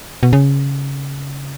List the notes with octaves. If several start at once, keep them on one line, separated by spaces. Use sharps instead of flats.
B2
C#3